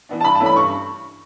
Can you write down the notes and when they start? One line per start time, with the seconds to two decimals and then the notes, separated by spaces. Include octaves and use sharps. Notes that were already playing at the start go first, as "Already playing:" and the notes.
0.09 E3 B3 D4
0.21 A5
0.24 G2 B5
0.35 A5
0.40 E3 A3 C#4 E4
0.46 B5
0.56 G2 C#6